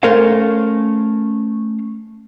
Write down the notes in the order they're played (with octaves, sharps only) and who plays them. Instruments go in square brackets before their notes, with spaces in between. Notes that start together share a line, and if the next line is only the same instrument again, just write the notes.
[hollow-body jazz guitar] A3 C#4 A#4 C5 C#5 F5